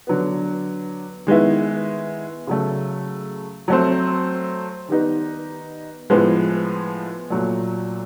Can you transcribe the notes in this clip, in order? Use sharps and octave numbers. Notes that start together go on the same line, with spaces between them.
D3 F#3 B3
D#3 G#3 B3 E4
C#3 F#3 A3
F#3 A3 C4
D#3 G3 B3 D#4
A2 F3 G#3 B3
A#2 F#3 A3